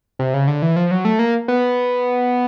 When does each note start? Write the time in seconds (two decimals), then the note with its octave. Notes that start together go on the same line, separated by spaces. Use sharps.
0.19 C3
0.34 C#3
0.48 D3
0.62 E3
0.76 F3
0.91 F#3
1.05 A3
1.19 A#3
1.48 B3